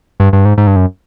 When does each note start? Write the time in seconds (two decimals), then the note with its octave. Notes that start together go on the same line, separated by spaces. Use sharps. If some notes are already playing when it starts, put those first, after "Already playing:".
0.20 G2
0.33 G2
0.45 G#2
0.57 G#2
0.67 G2
0.76 F#2